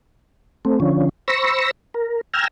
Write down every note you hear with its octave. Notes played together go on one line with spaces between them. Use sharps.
A3 C4
D3 F3 C#4
C5 B5 C#6 E6 A#6
A#4
G5 G#5 A#5 E6 F6